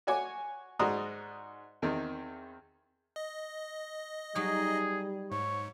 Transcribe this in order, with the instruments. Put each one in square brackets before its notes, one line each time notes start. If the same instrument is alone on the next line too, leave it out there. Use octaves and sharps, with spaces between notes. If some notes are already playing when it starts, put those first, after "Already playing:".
[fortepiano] F#4 C#5 G#5 D6
G#2 F#4 D5 A#5 D#6
E2 D#3 C4
[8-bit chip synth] D#5
[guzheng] F#3 D#4 [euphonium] G3 [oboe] G#4
[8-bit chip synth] G#2 [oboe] C#5